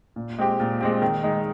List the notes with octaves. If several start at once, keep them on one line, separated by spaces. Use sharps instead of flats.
A#2
G#3 C4 G4
A#2
G#3 C4 G4
D#3
G#3 D#4